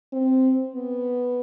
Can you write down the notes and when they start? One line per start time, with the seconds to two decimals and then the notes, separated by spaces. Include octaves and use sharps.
0.13 C4
0.75 B3